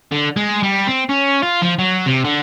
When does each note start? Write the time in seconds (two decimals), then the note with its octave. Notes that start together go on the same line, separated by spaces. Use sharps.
0.12 D3
0.36 G#3
0.63 G3
0.87 C4
1.09 C#4
1.42 F4
1.62 F3
1.79 F#3
2.06 C3
2.24 D3